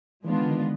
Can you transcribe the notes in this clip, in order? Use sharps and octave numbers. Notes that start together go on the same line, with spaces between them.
E3 G#3 B3 D4 F4
D#3
D3
D#3